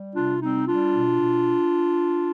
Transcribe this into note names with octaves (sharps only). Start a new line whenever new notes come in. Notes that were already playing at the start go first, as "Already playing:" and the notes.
Already playing: G3
C3 D4 F4
G3 C4 D#4
G3 D4 F4
B2
B2